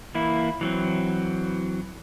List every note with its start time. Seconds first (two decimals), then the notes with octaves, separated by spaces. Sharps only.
0.14 E3 A#3 E4
0.61 E3 F#3 C4